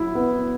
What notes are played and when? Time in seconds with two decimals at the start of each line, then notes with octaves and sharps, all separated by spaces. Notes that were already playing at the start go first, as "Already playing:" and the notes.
Already playing: F#3 E4
0.15 B3